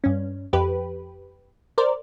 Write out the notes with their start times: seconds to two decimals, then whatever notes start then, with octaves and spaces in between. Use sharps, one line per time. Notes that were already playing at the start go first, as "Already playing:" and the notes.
0.04 G2 C#4
0.53 F2 G4 B4
1.78 A#4 C5 D5